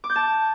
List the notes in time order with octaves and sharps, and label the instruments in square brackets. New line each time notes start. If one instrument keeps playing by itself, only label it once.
[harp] D6
G6
A5